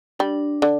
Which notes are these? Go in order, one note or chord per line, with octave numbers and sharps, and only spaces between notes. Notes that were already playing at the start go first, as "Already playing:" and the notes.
G3 D4
D3